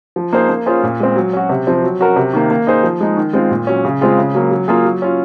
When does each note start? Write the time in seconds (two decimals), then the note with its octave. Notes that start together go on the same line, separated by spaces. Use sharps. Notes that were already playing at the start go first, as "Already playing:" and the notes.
0.16 F3
0.33 A#3 D#4 G#4 C5
0.49 A#3
0.66 C#4 F4 G#4 C5
0.83 A#2
1.00 G#3 C4
1.16 F#3
1.33 C#4 F#4
1.49 C3
1.67 F3 C4
1.83 F#3
2.00 C#4 F#4 A#4
2.16 C3
2.33 D#3 A#3
2.51 A#3
2.67 D#4 G#4 C5
2.83 F3
3.01 G#3 D#4
3.17 D#3
3.33 G#3 C4 F4
3.51 A#2
3.67 F#3 C#4
3.85 C#3
4.01 G#3 C4 F4 G#4
4.18 C#3
4.35 F#3 A#3
4.51 F#3
4.68 A#3 F4 G#4
4.85 F#3
5.02 C#4 F4